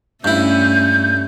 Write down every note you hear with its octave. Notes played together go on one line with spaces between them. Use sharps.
G2 A3 C#4 E4 G6